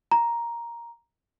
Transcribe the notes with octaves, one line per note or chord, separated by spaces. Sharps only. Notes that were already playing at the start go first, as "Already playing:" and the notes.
A#5